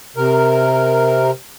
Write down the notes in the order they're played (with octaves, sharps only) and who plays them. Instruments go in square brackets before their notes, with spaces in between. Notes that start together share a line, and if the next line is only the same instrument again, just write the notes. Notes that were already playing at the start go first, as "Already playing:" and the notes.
[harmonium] C3 A#4